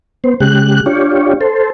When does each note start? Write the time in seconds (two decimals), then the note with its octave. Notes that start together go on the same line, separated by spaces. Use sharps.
0.24 B3 C5
0.40 C#3 G#3 G4 F#6
0.86 D4 F4 G4 C#5
1.41 A4 C5